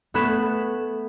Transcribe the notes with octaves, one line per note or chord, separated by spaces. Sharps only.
A3 B3 B5 F#6 G#6 E7